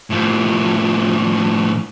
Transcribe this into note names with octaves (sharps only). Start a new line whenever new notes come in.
A2 F3